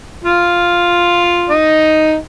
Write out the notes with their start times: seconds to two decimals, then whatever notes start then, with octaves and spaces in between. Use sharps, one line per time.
0.25 F4 F5
1.50 D#4 D#5